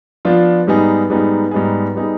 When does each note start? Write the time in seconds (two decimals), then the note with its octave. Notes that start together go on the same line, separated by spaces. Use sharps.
0.25 F3 B3 D4 F4
0.67 G#2 G3 B3 D#4 G#4
1.10 G#2 G3 B3 D#4 G#4
1.51 G#2 G3 B3 D#4 G#4
1.95 G3 B3 D#4 G#4